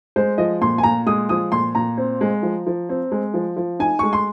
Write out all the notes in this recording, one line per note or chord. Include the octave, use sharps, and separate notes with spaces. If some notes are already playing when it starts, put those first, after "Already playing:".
G#3 C5
F3 D#5
A#2 C6
G#5
A#2 A#5
G#3 D#6
F3 D#6
A#2 C6
A#2 A#5
C4
G#3
F3
F3
C4
G#3
F3
F3
D#4 G#5
G#3 C#6
C6